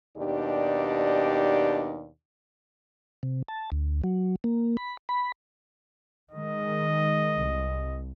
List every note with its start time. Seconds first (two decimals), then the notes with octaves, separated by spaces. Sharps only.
0.17 D#2 B2 D4 D#4 G4 D5
3.23 C3
3.48 A5
3.72 D2
4.04 F#3
4.44 A#3
4.77 B5
5.09 B5
6.32 D#3 G#3 D#5
7.41 C2